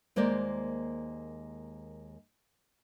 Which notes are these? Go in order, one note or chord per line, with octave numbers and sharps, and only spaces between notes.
D#2 G#3 A#3 A#4 C5 D5